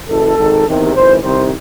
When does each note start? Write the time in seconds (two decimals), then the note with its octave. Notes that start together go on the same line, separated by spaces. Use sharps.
0.09 F#1 F#2 E3 A4
0.37 G#1 G#2 D#3
0.66 E2 C3 D#3
0.94 G#1 F#2 E3 C5
1.22 C2 C3 D#3 C5